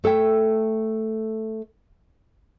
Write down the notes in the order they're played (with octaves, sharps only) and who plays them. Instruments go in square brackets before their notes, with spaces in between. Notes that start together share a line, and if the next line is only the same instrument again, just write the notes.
[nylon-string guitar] A3 A4 E5 G5